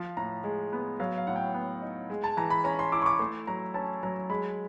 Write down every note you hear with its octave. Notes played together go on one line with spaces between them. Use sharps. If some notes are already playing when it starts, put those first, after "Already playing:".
Already playing: F3
A2 A#5
G#3
B3
F#3 F5
F5
A2 F#5
G5
B3
D#4
G#3
A5
E3 A#5
B5
C#4 A#5
C6
E4 D6
C#6
D6
A3 C6
F#3 A#5
C#4 A5
F#3 A#5
G#3 B5